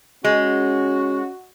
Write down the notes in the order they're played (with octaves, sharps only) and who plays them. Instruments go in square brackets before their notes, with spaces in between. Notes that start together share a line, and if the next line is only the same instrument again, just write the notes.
[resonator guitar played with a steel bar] G#3 [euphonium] C#4 [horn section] F#4